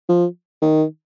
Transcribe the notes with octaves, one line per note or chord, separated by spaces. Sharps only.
F3
D#3